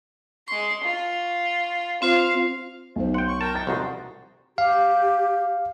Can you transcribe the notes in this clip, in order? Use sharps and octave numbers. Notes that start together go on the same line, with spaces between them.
G#3 C6 C#6
F4
C4 F4 C5 F5
B1 F#3 D#4 C5
C#5 F#5 G5 C6
C#6
A#4 G5 A5
D#3 G5 A6
C2 F2 D#4 F#4 C5
G4 F5